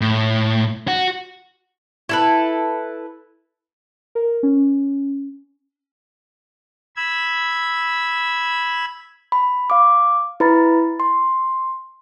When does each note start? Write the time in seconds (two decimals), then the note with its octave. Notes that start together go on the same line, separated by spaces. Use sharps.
0.01 A2
0.88 F#4
2.09 E4 A4 B4
4.15 A#4
4.43 C#4
6.96 B5 E6 G#6
9.32 B5
9.70 F5 D6
10.40 E4 B4 A#5 B5 A6
11.00 C6